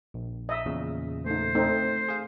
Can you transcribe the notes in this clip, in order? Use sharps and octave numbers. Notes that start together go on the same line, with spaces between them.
A#1
D#5 E5
E2 A#2 C#3
A3 D#4 C5
A3 C4 D#4
G#4 F5